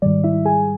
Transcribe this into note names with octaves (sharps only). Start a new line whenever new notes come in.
G#2 D#3 G3 D5
E4 E5
G#4 G#5